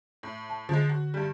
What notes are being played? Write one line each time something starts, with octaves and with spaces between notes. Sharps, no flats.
A2
A5
D3 F3 G#3
F#4
G2 G3